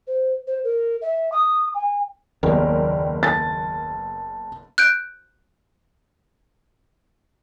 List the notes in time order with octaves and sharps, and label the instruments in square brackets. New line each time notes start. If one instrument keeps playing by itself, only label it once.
[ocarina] C5
C5
A#4
E5
D#6
G#5
[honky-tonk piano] F#1 B3 A#4 [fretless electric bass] D#2 [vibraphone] D5 G5
[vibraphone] A5 [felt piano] A6
[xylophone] F#6 G6 D7